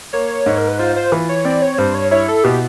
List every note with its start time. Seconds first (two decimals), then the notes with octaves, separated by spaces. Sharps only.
0.13 A#3 C#5
0.46 G#2
0.58 A#4
0.68 B4
0.79 F4 C5
0.96 C5
1.12 E3
1.29 C#5
1.45 C4 D5
1.62 C#5
1.78 G2 C5
1.95 C#5
2.11 E4 C#5
2.28 A4
2.44 B2 G4